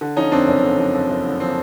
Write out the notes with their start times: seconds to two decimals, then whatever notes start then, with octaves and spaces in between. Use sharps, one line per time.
0.01 D3
0.16 F3 C#4 D#4
0.32 F2 C4 D4
0.47 F#1 C#4
0.64 D3
0.78 F3
0.94 F2
1.10 F#1
1.25 D3
1.40 F3 C4